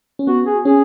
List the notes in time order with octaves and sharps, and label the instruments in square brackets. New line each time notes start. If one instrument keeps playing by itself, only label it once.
[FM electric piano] C#4
[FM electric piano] B3 [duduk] F#4
[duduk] G#4
[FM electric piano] C#4 [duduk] G#4